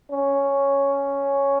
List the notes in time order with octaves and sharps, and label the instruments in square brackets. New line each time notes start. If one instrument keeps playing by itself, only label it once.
[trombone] C#4